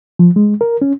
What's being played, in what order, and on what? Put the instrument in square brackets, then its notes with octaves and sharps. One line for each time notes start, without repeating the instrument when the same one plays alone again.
[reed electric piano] F3
G#3
A#4
C#4